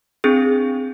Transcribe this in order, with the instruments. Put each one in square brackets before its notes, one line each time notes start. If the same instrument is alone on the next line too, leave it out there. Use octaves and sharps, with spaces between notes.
[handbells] C4 D4 G#4